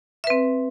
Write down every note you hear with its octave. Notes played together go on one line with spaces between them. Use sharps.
C4 B4 E5